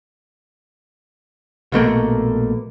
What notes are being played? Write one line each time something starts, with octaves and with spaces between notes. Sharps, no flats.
A#1 B2 A3 A#3